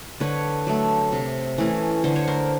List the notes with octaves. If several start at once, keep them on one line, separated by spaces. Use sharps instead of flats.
D3 B4 C#5
F#3 A3
C3
E3 A3 C#4
D3 C5
C#5
A#4 C5